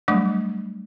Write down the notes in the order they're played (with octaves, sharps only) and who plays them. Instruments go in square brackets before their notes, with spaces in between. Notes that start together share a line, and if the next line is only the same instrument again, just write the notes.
[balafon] F#3 G3 A3 D4